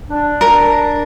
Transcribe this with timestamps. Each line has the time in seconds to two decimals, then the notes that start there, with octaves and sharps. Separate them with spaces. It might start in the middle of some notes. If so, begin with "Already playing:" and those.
0.10 D4
0.41 A#4